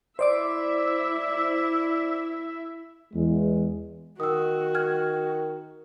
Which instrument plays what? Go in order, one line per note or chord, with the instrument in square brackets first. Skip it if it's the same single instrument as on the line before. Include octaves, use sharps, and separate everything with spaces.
[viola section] E4 E5 [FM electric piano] C5 D5 D6
[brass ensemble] E2 G#3
[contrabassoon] D#3 [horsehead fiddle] F#4 [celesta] D#6 E6
[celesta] G5 F6 G#6